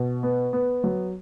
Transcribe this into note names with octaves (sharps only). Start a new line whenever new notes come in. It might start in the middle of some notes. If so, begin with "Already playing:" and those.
Already playing: B2
B3
B3
F#3